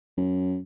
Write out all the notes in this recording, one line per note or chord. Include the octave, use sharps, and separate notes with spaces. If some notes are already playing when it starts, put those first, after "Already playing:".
F#2